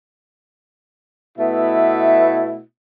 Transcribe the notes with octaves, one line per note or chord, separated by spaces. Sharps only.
B2 A3 B3 E4 E5